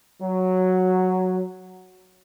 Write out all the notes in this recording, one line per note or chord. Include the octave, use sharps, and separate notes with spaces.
F#3